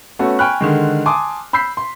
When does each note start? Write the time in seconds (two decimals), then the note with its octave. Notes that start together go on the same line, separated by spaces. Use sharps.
0.19 A3 B3 C#4 F#4 A4
0.39 G5 G#5 B5 C#6 F6 F#6
0.61 D3 D#3 G#3
1.06 G#5 A5 C6 D6 D#6
1.53 B5 E6 G6 B6 C7
1.77 C6